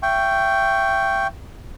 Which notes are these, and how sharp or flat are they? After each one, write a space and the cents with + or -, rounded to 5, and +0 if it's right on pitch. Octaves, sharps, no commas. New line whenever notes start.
E5 +30 G5 -5 C#6 +0